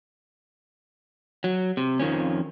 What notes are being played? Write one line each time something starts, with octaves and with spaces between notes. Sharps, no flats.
F#3
C3
F2 D#3 F3 C#4